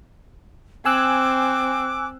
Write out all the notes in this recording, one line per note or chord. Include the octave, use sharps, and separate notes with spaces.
C4 G#5 D6 E6 F#6